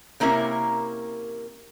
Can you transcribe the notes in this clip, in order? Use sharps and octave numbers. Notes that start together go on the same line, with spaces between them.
C3 A#3 C#4 E4 A#4